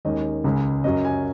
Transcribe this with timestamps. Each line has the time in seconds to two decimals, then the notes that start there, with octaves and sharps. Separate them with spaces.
0.05 D#2 D#3 G#3 C#4 D#5
0.44 C#2 C#3 G#3
0.84 F#2 F#3 C#4 D#5
1.05 G#5